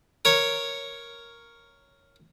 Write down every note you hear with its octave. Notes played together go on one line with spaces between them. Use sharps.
A#4 C#5